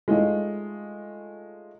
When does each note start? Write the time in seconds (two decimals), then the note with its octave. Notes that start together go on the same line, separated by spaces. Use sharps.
0.08 G#3 A3 C#4 D#4 F4